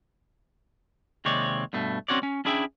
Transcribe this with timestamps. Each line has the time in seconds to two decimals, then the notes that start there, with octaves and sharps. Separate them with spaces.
1.25 D#2 C3 G#3 C4 C#5 D5
1.73 G2 B2 A3
2.08 C4 C#4 F#4 C#5 D5
2.23 C#4
2.45 C#4 D4 E4 G#4 E5 G5